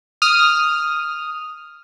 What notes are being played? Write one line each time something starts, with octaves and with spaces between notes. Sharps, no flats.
D#6 F6